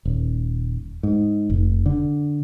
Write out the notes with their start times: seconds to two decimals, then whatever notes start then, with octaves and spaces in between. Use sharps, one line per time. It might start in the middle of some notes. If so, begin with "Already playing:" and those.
0.05 D#1
1.03 G#2
1.50 F1
1.86 D3